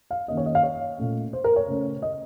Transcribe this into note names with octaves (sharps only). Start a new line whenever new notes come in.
F5
D#3 A#3 C#4 D#5
C#5
D#5
F5
C#5
A#2 A3 C#4
C5
A#4
C#5
C#3 A3 C#4
D#5